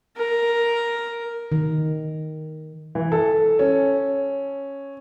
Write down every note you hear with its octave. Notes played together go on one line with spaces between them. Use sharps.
A#4
D#3
E3
A4
C#4